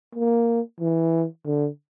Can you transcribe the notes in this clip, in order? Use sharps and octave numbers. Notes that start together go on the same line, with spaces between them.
A#3
E3
D3